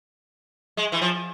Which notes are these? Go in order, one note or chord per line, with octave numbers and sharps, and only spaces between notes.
G#3
E3
F3